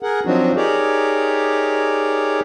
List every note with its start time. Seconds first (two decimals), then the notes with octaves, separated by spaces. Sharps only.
0.03 G#4 A#4 F#5
0.25 F3 F#3 C4 D4 D#4 F#4
0.56 D#4 G4 G#4 A#4 C#5 D5